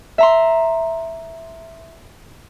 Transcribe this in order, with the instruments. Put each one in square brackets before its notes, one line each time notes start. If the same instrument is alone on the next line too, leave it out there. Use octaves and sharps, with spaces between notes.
[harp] E5 A#5 C6